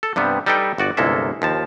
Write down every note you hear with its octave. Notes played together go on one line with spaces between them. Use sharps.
A4
G2 C3 G3 B3
G3 D#4 A4 B4 G5
G1 F#4 D5
G1 C2 G#3 A#3 A4 E5
D#2 F3 A5